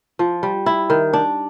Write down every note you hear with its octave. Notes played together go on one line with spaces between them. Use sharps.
F3
G3
E4
D#3
D4